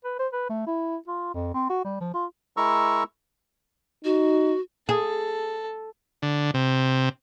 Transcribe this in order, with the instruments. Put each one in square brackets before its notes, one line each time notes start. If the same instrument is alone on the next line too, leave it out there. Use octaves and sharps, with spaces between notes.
[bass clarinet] B4
C5
B4
A3
E4
F4
F2
C4
F#4
G3
F3
F4
[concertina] G#3 E4 A#4 A#5 C#6 E6
[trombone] D#4 [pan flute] F#4
[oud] G#4 [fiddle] A4
[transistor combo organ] D3
C3